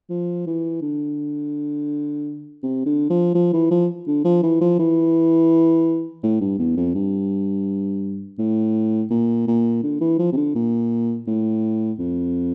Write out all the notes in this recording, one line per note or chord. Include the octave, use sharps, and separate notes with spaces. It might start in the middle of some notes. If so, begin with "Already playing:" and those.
F3
E3
D3
C3
D3
F3
F3
E3
F3
D3
F3
E3
F3
E3
A2
G2
E2
F2
G2
A2
A#2
A#2
D3
E3
F3
C3
D3
A#2
A2
F2